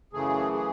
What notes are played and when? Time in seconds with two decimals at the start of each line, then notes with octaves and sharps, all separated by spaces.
0.13 F#2 C#3 E3 A3 G#4
0.53 G#4